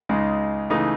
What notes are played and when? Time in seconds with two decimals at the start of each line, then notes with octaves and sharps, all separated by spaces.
0.09 C#2 C#3 G#3 D#4
0.70 C#3 E3 A3 D#4